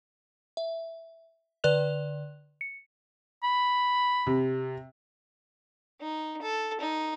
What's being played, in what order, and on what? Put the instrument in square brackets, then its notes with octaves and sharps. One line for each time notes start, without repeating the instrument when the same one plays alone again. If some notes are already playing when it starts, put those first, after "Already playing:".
[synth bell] E5
D3 B4 D5 F#6 F7
C#7
[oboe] B5
[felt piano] C3
[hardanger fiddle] D#4
A4
D#4